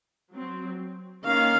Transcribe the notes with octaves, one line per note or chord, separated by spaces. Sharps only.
F#3 C4
D#3 A#3 C#4 F5